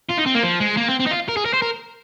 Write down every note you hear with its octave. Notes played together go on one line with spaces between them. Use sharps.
F4
D#4
C4
A#3
F3
G#3
A#3
C4
C4
D#4
F4
A#4
G#4
A#4
C5
A#4